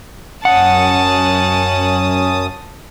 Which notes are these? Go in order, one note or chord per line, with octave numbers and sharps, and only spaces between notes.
F#2 C#4 F#5 A5 D#6